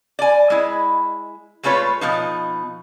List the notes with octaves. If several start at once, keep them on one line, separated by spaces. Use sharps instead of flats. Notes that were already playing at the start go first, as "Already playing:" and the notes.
D5 G#5
G#3 E4
G#3 A3 F4 B4 C#5
B2 F3 D#4